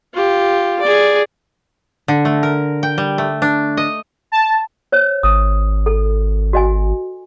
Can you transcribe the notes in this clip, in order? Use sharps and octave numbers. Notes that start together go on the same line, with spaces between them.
F4 G4
G#4 D5
D3
A3
A#4
G5
G3
A3
D4
D#5
A5
C5 C#5
G#1 D#6
A4
F#4 D#5 G#5